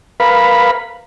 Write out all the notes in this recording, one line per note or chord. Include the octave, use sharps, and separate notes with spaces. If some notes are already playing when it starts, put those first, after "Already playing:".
A#4 B4 F5 B5